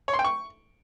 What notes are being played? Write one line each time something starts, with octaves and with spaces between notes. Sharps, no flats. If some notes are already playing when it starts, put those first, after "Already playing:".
C#5
C6
G5
C#6